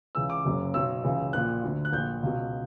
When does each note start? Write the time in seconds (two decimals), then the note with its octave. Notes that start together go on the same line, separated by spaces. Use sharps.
0.15 C#2 C#3 E3 E6
0.30 D6
0.45 F#1 F#2 C#3
0.74 B1 B2 E6
1.03 C#2 C#3 E3
1.33 A#1 A#2 F#6
1.63 D2 D3
1.85 F#6
1.92 A#1 A#2 G6
2.23 C#2 B2